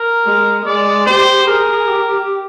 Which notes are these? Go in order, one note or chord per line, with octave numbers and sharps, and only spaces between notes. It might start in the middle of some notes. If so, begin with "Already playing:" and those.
Already playing: A#4
G#3
G#3 D5
G4 C5
G#4 A#4
G4